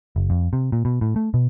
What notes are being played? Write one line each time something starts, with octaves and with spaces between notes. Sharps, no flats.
F#1
F2
C3
A#2
B2
A2
A3
B2